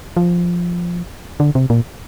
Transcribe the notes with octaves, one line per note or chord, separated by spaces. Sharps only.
F3
D3
C3
A#2